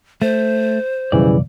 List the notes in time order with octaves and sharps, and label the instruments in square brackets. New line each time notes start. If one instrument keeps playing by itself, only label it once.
[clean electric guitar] A3 [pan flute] C5
[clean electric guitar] B1 F2 D5 [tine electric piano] C#3 E3 G3